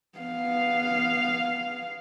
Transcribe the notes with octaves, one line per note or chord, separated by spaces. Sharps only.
B3 F5